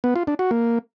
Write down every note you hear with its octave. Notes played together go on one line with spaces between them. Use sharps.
B3
F4
D4
F#4
A#3